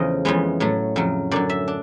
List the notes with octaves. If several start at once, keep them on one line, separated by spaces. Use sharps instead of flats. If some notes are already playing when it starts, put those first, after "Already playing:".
Already playing: E2 C#3 F3 A3 D#5
F2 C#3 E3 G#3 B3
A2 F#3 A3
F2 C#3 F#3
F#2 D3 F#3 D5
E5
D4